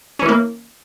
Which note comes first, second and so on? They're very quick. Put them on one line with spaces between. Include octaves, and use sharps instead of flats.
C#4 E3 E4 A#3